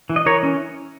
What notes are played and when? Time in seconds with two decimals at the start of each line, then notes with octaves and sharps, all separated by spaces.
0.10 E3
0.16 D#5
0.26 E3 A#4 C#5
0.43 C#4